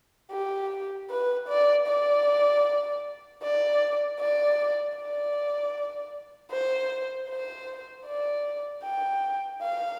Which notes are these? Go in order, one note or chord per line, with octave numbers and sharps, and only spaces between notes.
G4
B4
D5
D5
D5
D5
D5
C5
C5
D5
G5
F5